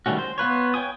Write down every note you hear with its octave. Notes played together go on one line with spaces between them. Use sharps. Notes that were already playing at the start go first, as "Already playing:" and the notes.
D#3 G3 A3 C#4 F#4
C5
B3 F4 B4 C#5
C#5 G5 G#5 D#6